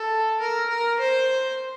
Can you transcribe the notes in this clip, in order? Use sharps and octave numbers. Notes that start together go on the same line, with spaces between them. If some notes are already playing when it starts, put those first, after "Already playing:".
Already playing: A4
A#4
A#4
C5